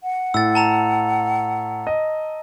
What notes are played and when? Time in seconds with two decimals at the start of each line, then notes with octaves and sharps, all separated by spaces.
0.03 F#5
0.34 A2 E6 A6
0.55 A5 A#5 F7
1.87 D#5